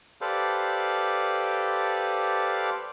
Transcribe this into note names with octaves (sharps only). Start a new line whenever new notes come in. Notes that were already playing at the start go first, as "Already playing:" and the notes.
G4 A4 B4 C5 D5 F5